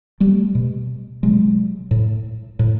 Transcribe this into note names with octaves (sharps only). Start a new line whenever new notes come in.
G3 A3
B2
B2 F#3 G#3
A2
A2